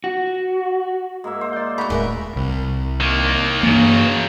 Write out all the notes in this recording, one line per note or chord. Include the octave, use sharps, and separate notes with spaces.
F#4
G#2 A#3 E5
C5
D5 G6
F#2 F#4 A#5 B5
D#1 A2 G#3 A#4 B4 E5
C2
D#3 A#3
G2 C#3 E3 F#3 A#3